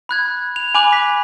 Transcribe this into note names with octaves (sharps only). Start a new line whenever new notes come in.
B5 F#6 G#6
F7
G#5 B5 D6 F#6 F7 F#7
B6